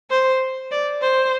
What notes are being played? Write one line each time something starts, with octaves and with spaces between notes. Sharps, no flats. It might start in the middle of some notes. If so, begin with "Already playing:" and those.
C5
D5
C5